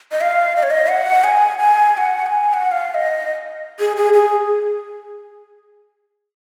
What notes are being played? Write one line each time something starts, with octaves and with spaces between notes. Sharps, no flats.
D#5
F5
D#5
C#5
D#5
F#5
G#5
G#5
G#5
F#5
G#5
G#5
F#5
F5
D#5
G#4
G#4
G#4